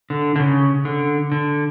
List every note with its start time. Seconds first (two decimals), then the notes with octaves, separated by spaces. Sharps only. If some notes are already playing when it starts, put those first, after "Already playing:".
0.10 D3
0.36 D3
0.40 C#3
0.85 D3
1.32 D3